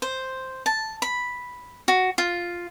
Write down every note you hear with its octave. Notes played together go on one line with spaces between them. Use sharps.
C5
A5
B5
F#4
F4